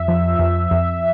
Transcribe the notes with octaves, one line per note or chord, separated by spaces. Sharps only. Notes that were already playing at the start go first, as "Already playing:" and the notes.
Already playing: F2 E5
F3
F2
F2